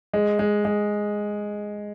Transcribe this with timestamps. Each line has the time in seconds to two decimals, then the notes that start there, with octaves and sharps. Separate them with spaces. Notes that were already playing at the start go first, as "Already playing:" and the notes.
0.14 G#3
0.39 G#3
0.65 G#3